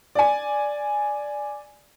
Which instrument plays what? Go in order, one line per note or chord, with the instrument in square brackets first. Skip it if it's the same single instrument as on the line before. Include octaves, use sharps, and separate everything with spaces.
[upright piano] D5 G#5